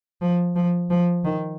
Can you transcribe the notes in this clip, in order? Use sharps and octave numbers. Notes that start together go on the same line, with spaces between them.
F3
F3
F3
D#3